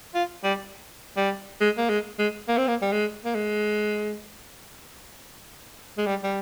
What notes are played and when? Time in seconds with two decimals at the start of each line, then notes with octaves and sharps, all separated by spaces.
0.15 F4
0.44 G3
1.17 G3
1.60 G#3
1.78 A#3
1.89 G#3
2.19 G#3
2.48 A#3
2.58 C4
2.68 A#3
2.82 G3
2.92 G#3
3.25 A#3
3.35 G#3
5.98 G#3
6.06 G3
6.23 G3